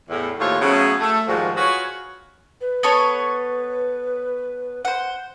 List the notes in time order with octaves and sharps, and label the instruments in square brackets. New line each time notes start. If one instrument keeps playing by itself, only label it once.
[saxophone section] E2 A2
D#2 A2 A3 F4 C5 C#5
C#3 F#3 A3 B3 C#4
A3
G#2 D#3 F3 G3 F#4
F4 F#4 G#4 B4 C#5
[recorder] B4
[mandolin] B3 A4 C#5
C5 F#5